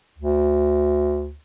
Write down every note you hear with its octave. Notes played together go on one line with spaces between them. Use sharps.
D2